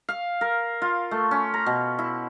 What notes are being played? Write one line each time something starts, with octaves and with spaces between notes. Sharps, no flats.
F5
A#4
F4
A3
C#4
A#5
B2
E4